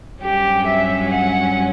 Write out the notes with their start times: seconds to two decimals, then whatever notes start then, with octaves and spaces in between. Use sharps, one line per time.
0.21 G2 F#3 C#4 G4
0.67 E5
1.12 F#5